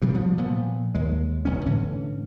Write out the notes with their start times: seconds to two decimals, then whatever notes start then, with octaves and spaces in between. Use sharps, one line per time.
0.02 G2 C3 F#3 G3
0.14 F3 G3 B3
0.38 A#2 F3 B3
0.94 D#2 G#3
1.45 F1 B1 G2 C#4
1.66 A2 D3 E3 C#4